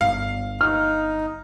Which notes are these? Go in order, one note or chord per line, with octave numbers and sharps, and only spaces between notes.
G1 F5
D#4 F6